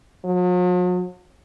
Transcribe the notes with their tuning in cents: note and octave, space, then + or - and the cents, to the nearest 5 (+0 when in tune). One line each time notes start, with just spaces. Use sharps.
F#3 -45